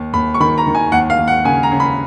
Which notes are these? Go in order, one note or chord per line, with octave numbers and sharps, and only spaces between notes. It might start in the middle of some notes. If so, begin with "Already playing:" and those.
Already playing: D#2
D#2 B5
C#6
D#3 B5
A#5
D#3
G#5
D#2 F#5
F5
D#2
F#5
C#3 G#5
A#5
C#3
B5